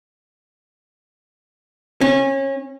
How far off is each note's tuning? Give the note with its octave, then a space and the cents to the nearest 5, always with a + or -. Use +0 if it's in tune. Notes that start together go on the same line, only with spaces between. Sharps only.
C#4 -25